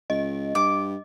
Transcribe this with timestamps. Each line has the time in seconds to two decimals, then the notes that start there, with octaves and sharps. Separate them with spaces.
0.10 C#2 D#5
0.55 G2 D6